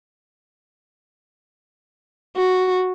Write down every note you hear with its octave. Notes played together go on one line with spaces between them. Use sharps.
F#4